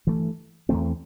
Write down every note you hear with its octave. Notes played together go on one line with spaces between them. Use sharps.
G2 E3 A3
E2 E3 A3 C4